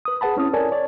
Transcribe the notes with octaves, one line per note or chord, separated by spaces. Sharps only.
B4 D#6
G#4 B4 F#5 A5 B5
C4 C#4 E4 D#6
A4 A#4 C#5 D5 G#5 A5
C#5 D5